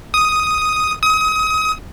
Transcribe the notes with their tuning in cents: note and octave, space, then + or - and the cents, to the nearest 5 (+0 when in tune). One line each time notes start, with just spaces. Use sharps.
D#6 +5
D#6 +30